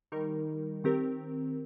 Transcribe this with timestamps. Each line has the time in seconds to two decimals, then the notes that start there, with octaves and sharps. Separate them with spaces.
0.12 D#3 G3 D#4 A#4
0.84 D#3 C4 G4 A#4